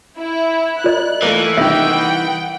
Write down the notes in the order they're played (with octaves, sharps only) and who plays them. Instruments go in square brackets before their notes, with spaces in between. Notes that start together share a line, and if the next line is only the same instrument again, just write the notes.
[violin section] E4
[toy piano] F4 D5 D#5 [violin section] F#6
[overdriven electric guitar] E3 [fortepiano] A3 A#3
[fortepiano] C2 D#3 [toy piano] E5 [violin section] F#5 G5